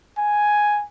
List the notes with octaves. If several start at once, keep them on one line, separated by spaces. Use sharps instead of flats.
G#5